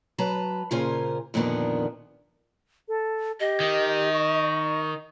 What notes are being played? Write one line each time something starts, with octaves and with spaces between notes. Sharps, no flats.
F#3 B4 A5 A#5
A#2 C#3 F4 A#4 C5 G#5
F2 A#2 D3 D#3 B3 D4
A4
G4 D#5
D#3
C#6